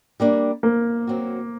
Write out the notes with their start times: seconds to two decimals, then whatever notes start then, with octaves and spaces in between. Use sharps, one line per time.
0.20 G3 A#3 D4
0.63 A#3
1.07 F#3 C4 F#4